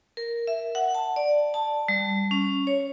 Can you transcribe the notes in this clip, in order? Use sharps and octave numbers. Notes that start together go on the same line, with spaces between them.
A#4
E5
F#5
A5
D5
A5
G3
C#4
C#5